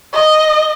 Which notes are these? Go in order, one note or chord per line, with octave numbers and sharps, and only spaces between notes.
D#5